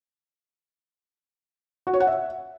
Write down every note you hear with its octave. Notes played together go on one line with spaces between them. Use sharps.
F#4
C#5
F#5
E5